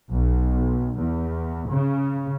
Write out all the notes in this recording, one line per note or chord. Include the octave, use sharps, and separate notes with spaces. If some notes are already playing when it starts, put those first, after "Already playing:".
B1
E2
C#3